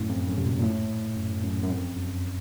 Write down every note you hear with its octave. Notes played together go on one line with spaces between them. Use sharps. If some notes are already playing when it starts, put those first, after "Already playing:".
Already playing: F#2 A2
F2
F#2
C3
A#2
A#2
A2
F#2
F#2
F#2
F2
F#2